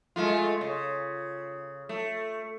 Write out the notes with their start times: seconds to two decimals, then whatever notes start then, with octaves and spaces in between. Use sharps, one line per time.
0.16 G#3 A3 F4
0.61 C#3
1.89 A3